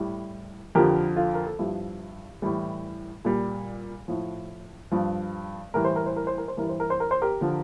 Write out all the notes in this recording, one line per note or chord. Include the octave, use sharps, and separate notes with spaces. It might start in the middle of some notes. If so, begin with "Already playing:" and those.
Already playing: A2 G3
F2 D3 F3 G4 A#4
F4 A4
A#4
A4
G2 F3 E4 G4
A2 E3 G3
A#2 G3
A2 F3
G2 F3
A2 E3 G3 A#4
C5
A#4
C5
A#4
C5
A#4
C5
G2 E3 G3 A#4
C5
A#4
C5
A#4
C5
G4 A#4
D3 F3